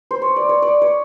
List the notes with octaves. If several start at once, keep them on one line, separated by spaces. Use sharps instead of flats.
C5
C#5
D5
C#5
D5
C#5